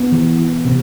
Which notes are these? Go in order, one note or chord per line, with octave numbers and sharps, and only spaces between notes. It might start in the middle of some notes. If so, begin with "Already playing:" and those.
Already playing: B3
E3
E3
C3